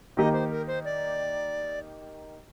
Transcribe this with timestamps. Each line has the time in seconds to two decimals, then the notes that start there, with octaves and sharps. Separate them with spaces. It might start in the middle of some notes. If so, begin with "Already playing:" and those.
0.17 D#3 A#3 D#4 G4 D#5
0.33 C5
0.50 A#4
0.67 C5
0.85 D5